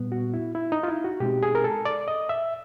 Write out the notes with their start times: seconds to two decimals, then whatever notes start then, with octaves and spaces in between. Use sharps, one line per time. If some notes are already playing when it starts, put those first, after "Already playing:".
Already playing: A#2 G3 B3
0.12 F#4
0.34 E4
0.55 E4
0.72 D#4
0.83 F4
0.88 E4
1.04 F#4
1.20 B2 G#3 C4 D#4 G4
1.43 G#4
1.55 A#4
1.64 A4
1.85 D5
2.08 D#5
2.29 E5